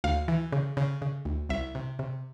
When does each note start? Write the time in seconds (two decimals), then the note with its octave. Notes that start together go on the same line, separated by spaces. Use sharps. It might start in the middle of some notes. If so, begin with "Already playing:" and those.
0.04 D2 F5
0.28 E3
0.52 C#3
0.77 C#3
1.02 C#3
1.25 D2
1.49 C2 E5
1.75 C3
1.99 C3